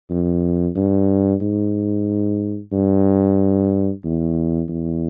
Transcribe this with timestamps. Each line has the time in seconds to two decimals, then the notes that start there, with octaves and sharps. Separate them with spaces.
0.10 F2
0.76 G2
1.41 G#2
2.72 G2
4.05 E2
4.69 E2